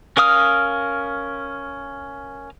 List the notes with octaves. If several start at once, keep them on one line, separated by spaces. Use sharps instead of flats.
C#4 A#4 F5 D#6 F6